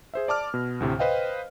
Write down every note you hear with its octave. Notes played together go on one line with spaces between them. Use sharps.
G#4 C5 E5
D5 A5 D6 F6
B2
D2 A2 C3
B4 C5 D#5 F5 G5